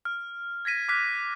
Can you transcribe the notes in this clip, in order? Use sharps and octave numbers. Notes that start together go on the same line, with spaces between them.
F6
G#6 A#6 B6 D#7
D6 F6 F#6 B6